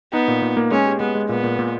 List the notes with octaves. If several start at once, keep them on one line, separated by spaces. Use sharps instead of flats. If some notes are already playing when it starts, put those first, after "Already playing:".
B3 D#4
A#2
A#2
A#3
G#3 C#4
G4
G#3 B3
G#3
A#2 B3
A#2
A#2